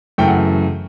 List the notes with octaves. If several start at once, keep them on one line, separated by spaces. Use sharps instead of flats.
F#2 C#3 E3 A3 G5
F#5